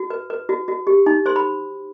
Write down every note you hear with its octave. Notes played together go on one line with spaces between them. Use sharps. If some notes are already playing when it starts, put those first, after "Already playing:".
Already playing: F#4
B4
B4
F#4
F#4
G4
D#4
C5 C6
B5